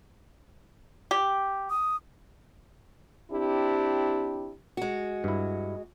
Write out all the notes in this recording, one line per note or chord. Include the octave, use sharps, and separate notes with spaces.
G4
D#6
C4 D4 E4 G4
G#3 F#4
G2 E4